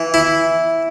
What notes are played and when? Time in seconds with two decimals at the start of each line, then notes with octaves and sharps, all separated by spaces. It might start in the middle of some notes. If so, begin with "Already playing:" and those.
Already playing: E3
0.14 E4